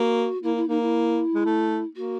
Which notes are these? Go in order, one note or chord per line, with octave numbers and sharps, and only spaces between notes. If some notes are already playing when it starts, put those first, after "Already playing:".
Already playing: A#3 F#4
A#3 E4
E4
A#3 D#4
E4
G#3
A3
A#3 F#4